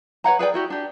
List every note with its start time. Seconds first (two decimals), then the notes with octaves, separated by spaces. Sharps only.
0.24 B4 C#5 F#5 A#5
0.39 G#4 B4 D5 G5
0.54 E4 F#4 G4
0.70 D4 G4